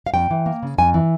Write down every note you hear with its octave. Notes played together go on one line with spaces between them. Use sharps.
F5
F2 G5
E3
A#3
C#3
F2 G#5
E3